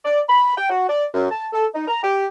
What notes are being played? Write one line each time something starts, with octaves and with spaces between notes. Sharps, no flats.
D5
B5
G5
F#4
D5
F#2
A5
A4
D#4
A#5
G4